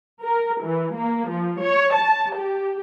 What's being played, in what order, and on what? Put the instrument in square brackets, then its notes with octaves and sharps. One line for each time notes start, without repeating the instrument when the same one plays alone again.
[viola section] A#4
E3
A#3
F3
C#5
A5
G4